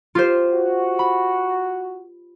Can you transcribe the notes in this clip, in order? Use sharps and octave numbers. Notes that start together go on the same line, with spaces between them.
F4 G4 C5
F#4
B5